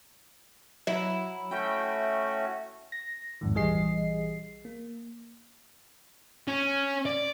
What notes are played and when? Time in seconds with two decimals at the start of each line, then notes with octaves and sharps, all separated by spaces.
0.87 F#3 E4
1.51 A3 C#4 F#4 E5 G5
2.92 A#6
3.41 A1 F2 G#2 D#3
3.55 A#1 E3 G3 G#4 D#5 C7
4.65 A#3
6.48 C#4
7.06 D5